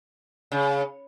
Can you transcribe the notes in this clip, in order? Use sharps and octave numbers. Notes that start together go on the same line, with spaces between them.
C#3